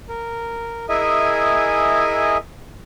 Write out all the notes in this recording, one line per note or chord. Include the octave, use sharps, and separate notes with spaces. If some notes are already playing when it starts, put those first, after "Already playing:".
A#4
E4 G#4 A#4 D#5 E5 G#5